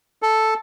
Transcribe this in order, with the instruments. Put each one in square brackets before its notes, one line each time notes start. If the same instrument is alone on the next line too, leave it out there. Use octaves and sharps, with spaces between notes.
[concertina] A4